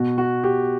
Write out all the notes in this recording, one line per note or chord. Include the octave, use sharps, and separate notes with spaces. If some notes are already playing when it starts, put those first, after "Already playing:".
Already playing: B2 F#4
F#4
G4